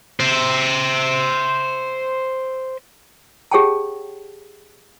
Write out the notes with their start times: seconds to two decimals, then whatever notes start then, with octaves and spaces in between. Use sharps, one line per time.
0.20 C5 E5
3.52 G4 G#4 C#5 F#5 G5 A5